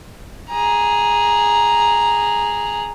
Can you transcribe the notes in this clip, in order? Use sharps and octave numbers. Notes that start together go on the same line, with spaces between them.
G#4 A#5